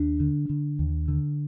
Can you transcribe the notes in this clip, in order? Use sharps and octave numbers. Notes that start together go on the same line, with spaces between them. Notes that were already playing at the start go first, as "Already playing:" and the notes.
Already playing: D#2 D4
D3
D3
D#2
D3